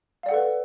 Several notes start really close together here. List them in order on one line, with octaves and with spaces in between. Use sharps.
F5 D5 F#5 A4 B4